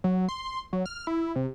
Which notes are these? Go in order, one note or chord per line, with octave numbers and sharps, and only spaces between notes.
F#3
C6
F#3
F6
E4
C3